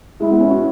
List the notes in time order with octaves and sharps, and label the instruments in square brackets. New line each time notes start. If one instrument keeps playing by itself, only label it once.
[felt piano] G#3 [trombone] E4
[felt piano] B3
C#4
F#4